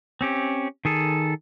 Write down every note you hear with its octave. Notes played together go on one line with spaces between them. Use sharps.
C4 C#4 G4
D#3 G#4 A4